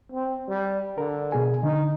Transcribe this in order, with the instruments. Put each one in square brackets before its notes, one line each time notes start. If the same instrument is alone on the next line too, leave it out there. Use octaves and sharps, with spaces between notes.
[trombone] C4
G3
[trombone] D3 [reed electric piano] A#4
[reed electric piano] B2 G#4 G#5
[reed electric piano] D3 [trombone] D#4